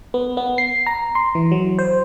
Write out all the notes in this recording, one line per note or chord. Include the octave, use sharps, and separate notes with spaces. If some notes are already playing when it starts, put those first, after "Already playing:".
B3
B3
C7
A#5
C6
E3
F#3
C5